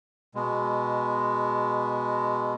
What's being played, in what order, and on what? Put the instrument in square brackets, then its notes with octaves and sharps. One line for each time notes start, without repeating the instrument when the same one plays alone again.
[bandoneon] B2 G#3